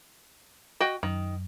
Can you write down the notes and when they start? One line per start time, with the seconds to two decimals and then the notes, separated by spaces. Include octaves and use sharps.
0.81 F#4 D#5 G5
1.03 F#2 D#3